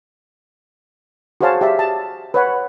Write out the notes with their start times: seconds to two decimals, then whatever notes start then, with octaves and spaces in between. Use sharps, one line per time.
1.41 F#4 G#4 C5 C#5 F5 A5
1.61 G4 E5
1.79 A5
2.34 B4 C#5 F#5